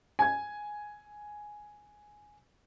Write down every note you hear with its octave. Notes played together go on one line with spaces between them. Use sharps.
G#5 G#6